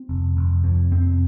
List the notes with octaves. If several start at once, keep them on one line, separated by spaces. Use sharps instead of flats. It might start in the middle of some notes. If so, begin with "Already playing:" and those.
Already playing: C4
F1
F1
F2
F1 C4